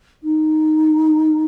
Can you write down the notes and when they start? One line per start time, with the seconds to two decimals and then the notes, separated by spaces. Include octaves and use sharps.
0.24 D#4